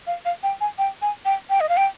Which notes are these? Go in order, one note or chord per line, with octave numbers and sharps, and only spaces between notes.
F5
F5
G5
G#5
G5
G#5
G5
G5
D#5
F5
G5